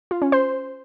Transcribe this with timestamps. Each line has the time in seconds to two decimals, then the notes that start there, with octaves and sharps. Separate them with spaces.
0.11 F4
0.22 C#4
0.32 C5